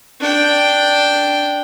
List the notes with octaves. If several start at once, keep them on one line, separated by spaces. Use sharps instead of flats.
D4 G5